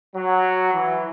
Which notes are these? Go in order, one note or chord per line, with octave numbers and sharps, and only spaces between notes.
F#3
E3